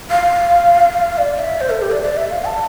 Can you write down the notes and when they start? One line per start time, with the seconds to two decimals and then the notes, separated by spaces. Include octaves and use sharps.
0.10 F5
1.18 D5
1.38 E5
1.61 C5
1.70 A4
1.82 G4
1.91 D5
2.03 D5
2.17 E5
2.31 F5
2.45 A5